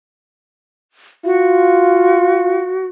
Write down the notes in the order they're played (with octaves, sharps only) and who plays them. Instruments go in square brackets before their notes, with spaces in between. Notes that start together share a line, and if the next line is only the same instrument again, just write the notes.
[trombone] F4 [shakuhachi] F#4